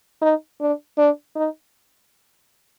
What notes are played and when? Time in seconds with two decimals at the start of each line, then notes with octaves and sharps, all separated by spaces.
0.22 D#4
0.61 D4
0.98 D4
1.36 D#4